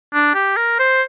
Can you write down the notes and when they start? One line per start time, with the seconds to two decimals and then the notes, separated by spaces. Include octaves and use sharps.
0.14 D4
0.34 G4
0.57 A#4
0.79 C5